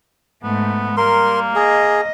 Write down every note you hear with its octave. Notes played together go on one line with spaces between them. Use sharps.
G#2 A3 B3
G3 A#3 A#4 C6
G#4 D#5